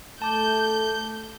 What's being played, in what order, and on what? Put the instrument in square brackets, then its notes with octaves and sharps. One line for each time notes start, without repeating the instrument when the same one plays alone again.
[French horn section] A3 [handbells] A5 D6 [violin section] G6